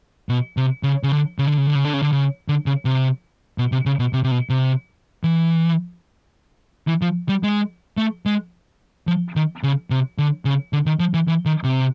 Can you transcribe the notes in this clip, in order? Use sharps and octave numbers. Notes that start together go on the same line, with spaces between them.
B2
C3
C#3
C#3
D3
C#3
D3
C#3
D3
C#3
D3
C#3
D3
C#3
D3
C#3
C3
B2
C3
C#3
B2
C3
C3
B2
C3
E3
E3
F3
G3
G#3
A3
G#3
F3
D#3
C#3
C3
D3
C#3
D3
D#3
F3
E3
E3
D#3
C3